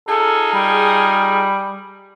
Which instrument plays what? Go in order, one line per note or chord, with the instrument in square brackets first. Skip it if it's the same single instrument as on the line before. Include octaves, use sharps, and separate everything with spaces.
[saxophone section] D#4 F4 G#4 [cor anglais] A4
[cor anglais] G3